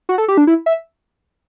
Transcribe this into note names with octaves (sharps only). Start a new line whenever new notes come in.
F#4
A4
G4
D4
E4
E5